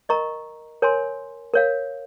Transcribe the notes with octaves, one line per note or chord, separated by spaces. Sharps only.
A#4 D#5 A#5 C#6
A#4 C#5 G#5 C6
A#4 C#5 F5